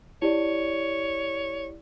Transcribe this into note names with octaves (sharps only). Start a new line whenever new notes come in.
E4 G4 C#5 D5